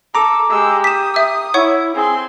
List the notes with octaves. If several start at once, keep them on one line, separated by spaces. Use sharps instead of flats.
A4 A#5 D6
G#3 G4 E6
D#6 B6 E7
E5 E6
E4 C#5 F#5 C#6
C4 G#4 C6